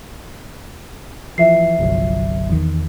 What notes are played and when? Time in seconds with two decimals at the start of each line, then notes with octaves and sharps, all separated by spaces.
1.38 E3 F3 E5 C7
1.79 G1 C2 F#3
2.50 E2 D#3